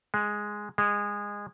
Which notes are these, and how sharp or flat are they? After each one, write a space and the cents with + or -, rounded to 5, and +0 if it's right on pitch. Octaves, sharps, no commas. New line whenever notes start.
G#3 +0
G#3 -20